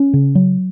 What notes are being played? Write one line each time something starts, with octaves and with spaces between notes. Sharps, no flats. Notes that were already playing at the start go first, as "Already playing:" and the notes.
Already playing: C#4
C#3
F#3